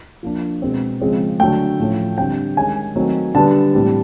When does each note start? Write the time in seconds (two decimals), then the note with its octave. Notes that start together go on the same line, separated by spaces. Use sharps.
0.23 F3 A#3 D4
0.62 B2 G#3 C4
1.01 C#3 F3 G#3 C4
1.39 D3 F#3 A3 G5
1.79 A2 F3 A3 C#4
2.18 D3 G3 C4 G5
2.56 D#3 G#3 C#4 G#5
2.95 D#3 F#3 A3 C4
3.35 D3 G3 B3 A5
3.74 A2 E3 G3 C4